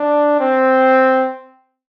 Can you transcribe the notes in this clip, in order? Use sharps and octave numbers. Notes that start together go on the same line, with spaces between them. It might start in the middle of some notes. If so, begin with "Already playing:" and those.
Already playing: D4
C4